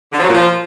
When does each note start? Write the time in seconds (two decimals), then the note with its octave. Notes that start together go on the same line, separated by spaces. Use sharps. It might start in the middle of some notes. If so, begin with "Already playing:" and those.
0.13 D3
0.18 F3
0.23 F#3
0.28 A#2
0.34 F3